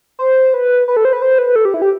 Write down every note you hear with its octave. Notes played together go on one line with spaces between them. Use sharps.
C5
B4
B4
A4
C5
B4
C5
B4
A4
G4
E4
G4